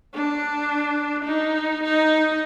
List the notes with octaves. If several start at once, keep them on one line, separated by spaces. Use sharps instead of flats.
D4
D#4
D#4